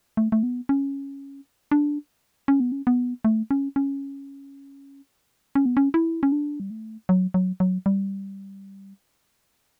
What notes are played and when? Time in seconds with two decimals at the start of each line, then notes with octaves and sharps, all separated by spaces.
0.17 A3
0.32 A3
0.43 B3
0.69 C#4
1.71 D4
2.48 C#4
2.60 B3
2.72 C#4
2.87 B3
3.25 A3
3.51 C#4
3.76 C#4
5.55 C#4
5.66 B3
5.77 C#4
5.94 E4
6.23 C#4
6.32 D4
6.60 G3
6.70 A3
7.09 F#3
7.34 F#3
7.60 F#3
7.86 G3